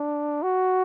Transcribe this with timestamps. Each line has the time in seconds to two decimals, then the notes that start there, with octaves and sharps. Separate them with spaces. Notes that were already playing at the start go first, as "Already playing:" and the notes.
Already playing: D4
0.43 F#4